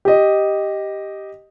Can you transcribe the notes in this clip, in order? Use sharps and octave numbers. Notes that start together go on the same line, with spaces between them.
G4 D#5